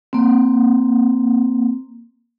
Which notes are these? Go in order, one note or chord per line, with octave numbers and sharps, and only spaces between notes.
A#3 C4